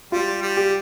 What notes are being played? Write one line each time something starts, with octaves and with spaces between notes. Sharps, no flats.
G3 F4
G3
G4